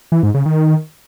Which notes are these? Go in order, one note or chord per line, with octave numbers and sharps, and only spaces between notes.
E3
G#2
C#3
D#3